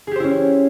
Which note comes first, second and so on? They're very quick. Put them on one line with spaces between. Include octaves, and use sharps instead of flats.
G#4 G4 C5 E4 C#4